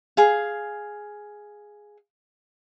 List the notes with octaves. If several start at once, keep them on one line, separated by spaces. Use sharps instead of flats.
G#4 F5